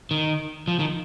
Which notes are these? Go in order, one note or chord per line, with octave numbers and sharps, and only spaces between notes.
D#3
F3
D#3